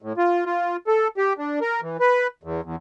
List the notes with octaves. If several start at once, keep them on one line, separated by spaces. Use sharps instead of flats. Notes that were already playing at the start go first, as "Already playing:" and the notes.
A2
F4
F4
A4
G4
D4
A#4
E3
B4
E2
E2